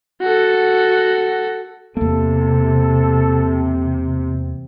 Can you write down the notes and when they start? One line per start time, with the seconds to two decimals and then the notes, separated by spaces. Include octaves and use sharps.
0.21 F#4 A4
1.97 E2 C3 A#3 A4